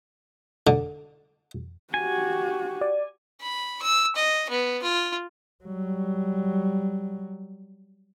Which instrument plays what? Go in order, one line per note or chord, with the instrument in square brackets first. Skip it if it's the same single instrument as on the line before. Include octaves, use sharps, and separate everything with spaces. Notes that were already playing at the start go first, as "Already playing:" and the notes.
[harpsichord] D3
[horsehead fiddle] F#4 G4 [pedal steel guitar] G#5
[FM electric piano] D5
[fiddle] B5
E6
D#5
B3
F4
[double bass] F#3 G3